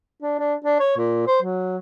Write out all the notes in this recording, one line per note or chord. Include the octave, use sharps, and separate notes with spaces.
D4
D4
D4
C#5
A#2
C5
F#3